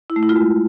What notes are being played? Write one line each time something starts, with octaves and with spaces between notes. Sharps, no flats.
E4
A3
E4
F4
G#3